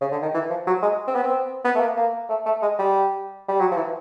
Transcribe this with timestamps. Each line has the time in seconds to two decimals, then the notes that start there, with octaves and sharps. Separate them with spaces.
0.01 C#3
0.12 D3
0.22 D#3
0.34 E3
0.50 F3
0.67 F#3
0.82 G#3
1.07 C4
1.15 B3
1.23 C4
1.65 B3
1.75 A3
1.80 A#3
1.97 A#3
2.29 A3
2.46 A3
2.62 G#3
2.79 G3
3.48 G3
3.60 F#3
3.71 F3
3.77 E3